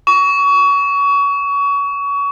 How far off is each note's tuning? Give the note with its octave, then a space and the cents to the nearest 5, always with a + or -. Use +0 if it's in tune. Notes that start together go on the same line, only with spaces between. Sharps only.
C#6 +30